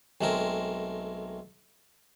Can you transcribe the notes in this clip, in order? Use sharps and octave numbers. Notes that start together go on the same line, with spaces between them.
B1 G#3 A3 C4 A#4